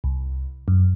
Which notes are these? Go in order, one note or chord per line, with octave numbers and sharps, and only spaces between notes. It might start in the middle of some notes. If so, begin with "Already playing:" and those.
C2
F#2